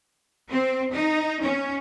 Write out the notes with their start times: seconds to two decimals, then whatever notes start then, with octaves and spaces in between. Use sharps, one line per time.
0.49 C4
0.93 D#4
1.41 C#4